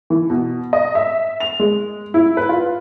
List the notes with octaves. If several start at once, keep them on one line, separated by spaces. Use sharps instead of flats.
E3
B2
D#5
E5
F7
G#3
E4
B4
F4